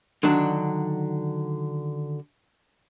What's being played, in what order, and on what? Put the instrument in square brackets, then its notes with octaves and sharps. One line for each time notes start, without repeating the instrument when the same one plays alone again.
[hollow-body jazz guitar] D3 D#3 F#3 D4